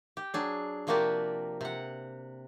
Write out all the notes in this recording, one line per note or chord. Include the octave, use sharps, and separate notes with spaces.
G4
F#3 D4 G#4
C3 F3 A#3 F#4 G4 D5
C3 F#5